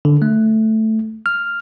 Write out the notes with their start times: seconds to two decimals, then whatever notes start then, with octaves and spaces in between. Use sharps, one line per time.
0.05 D3
0.22 A3
1.26 F6